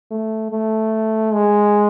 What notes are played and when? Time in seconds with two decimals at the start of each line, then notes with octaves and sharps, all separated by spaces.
0.11 A3
0.51 A3
1.33 G#3